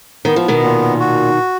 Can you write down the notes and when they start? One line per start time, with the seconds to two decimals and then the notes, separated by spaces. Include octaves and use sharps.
0.25 D#3 B3
0.36 F3
0.48 B2 D#3
0.62 A#2
1.00 F#4